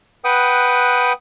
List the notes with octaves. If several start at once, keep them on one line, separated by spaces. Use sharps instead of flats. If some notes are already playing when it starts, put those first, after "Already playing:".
B4 F#5 G5 D#6